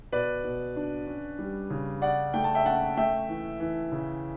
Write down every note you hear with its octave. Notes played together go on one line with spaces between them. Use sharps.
B2 B4 D5
B2
D4
C#4
G3
C#3
C#4 D5 F#5
A3 G5
A5
E5 G5
C#4 F#5 A5
A3 E5 G5
E3
E3
C#3